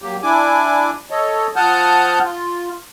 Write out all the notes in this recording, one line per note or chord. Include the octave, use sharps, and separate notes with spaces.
F#3 A#3 G4
D4 E4 G#5 D6
A4 C#5 D#5
F3 F#5 A5 D#6 F6 G6
F4